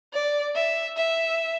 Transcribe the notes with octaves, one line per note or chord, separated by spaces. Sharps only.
D5
E5
E5